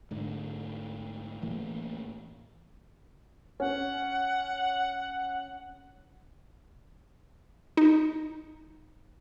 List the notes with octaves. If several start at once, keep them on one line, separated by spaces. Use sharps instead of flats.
G#2 D3 A3
A2 E3 A3 A#3
C#4 F#5
D#4